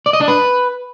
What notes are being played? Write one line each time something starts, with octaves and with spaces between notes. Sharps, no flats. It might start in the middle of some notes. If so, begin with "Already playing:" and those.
D5
D#5
D4
B4